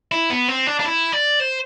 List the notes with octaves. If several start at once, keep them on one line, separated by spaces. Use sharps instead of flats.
E4
B3
C4
D4
D4
E4
D5
C5